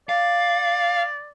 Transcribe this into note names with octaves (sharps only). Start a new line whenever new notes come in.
D5 F5